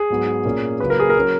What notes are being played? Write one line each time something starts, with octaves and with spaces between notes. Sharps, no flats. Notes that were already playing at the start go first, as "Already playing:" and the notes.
Already playing: G#4
G#2 F#3 B3
A#2 A#3 C#4
C#3 F#3 A#3 B4
A#4
G#4
A#4
F#3 C#4